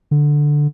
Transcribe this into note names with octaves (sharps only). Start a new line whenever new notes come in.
D3